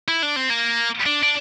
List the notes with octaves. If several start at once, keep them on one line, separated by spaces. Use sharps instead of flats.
E4
D4
C4
A#3
D4
D4